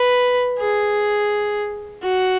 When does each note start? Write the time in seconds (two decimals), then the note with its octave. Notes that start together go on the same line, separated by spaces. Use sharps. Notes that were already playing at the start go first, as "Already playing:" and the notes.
Already playing: B4
0.59 G#4
2.03 F#4